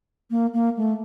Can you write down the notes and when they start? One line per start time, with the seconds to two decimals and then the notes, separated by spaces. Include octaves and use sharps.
0.30 A#3
0.53 A#3
0.77 A3